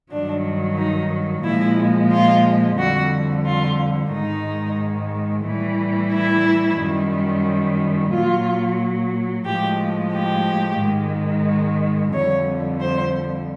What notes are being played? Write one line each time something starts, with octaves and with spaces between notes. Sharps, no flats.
G2 D#3 F#3 D4
D#4
A#2 F3 G#3 E4
F4
F2 D3 G3 F#4
F4
G#2 D#3 G#3 D#4
A2 E3 G3
E4
F#2 D#3 G3
A#2 F#3 F4
A2 F3 G#3 G4
G4
G#2 D#3 G#3
F2 D3 G3 C#5
C5